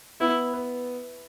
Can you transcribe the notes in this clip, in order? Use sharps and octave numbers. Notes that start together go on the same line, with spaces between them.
B3 E4
B4